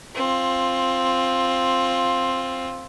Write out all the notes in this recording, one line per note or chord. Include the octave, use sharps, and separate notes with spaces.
C4 F4